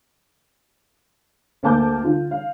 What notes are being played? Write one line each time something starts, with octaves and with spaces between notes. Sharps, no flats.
D2 A#3 A5 D6 G6
D3 F4
F5